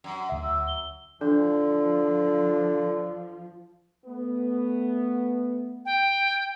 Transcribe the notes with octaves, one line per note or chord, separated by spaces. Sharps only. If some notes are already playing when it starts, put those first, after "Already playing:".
F#2
D2 E5
E6
G7
D3 F3 D4
A3 B3
G5